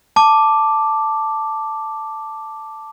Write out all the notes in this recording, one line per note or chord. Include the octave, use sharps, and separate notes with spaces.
A5 D6